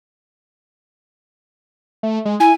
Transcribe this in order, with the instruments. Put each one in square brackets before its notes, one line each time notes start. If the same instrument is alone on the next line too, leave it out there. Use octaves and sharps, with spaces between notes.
[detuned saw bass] A3
G#3
[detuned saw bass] E4 [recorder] G#5